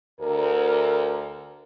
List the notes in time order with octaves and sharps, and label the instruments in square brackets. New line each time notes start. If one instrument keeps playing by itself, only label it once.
[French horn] D2 [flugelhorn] A#4